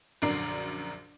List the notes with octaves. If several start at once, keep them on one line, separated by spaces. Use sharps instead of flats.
A#1 F#2 D3 A#4 D5 C7